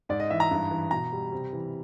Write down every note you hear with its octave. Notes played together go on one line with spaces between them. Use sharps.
G#2 D5
D#5
E3 E5
A#5
G2
E3
B2 A#5
G3
C3
E3